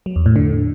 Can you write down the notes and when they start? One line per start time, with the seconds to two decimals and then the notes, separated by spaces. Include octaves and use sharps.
0.06 F#3
0.16 E2
0.26 A2
0.36 D3